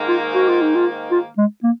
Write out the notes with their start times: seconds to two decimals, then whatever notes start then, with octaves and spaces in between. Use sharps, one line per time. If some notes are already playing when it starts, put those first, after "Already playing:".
Already playing: G#2 D#3 A#3
0.08 F4
0.34 F#4
0.48 F4
0.62 D#4
0.75 F4
1.11 F4
1.37 G#3
1.63 A#3